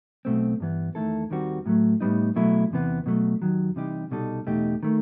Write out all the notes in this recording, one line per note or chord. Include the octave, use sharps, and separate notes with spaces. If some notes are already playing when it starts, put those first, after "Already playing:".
B1 B2 A3 C4
G2 E3 B3
E2 D#3 A3 E4 A4
D#2 D#3 G3 C4 F#4
A2 F#3 A3
A2 G3 B3 D#4
B2 F#3 A3 E4
E2 C3 E3 B3
B2 F#3 A3
D#2 D#3 F#3
C3 E3 G3 D#4 G4
C2 B2 G3 D#4 A4
E2 B2 A3 D#4 G4
D#3 A3